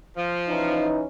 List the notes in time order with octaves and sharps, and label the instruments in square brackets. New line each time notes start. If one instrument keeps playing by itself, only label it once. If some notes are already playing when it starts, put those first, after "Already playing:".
[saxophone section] F3
[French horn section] E3 C#4 D#4